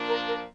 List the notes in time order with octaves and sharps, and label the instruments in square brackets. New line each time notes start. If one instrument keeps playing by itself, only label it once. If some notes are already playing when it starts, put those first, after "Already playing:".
Already playing: [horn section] A#2 F3 A#3 D4
[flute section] A#4
A#4